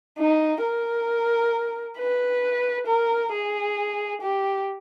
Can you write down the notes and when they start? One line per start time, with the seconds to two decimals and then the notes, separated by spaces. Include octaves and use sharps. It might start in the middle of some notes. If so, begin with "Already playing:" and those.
0.18 D#4
0.63 A#4
1.98 B4
2.87 A#4
3.32 G#4
4.21 G4